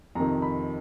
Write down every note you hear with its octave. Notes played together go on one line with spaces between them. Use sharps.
F2 C3 D#3 A#5
B5